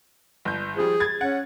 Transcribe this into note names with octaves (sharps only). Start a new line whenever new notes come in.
G1 G6
F3 G3 G#4
G#6 A6
C#4 F#5